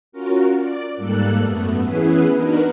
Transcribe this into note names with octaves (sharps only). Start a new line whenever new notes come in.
C#4 F4 F#4 A#4
D5
G#2 G3 A#3 A4 F#6
F#2 A3 B3
E3 B3 C#4 E4 G#4 B4
B3 D4 D#4 F#4 A#4 B4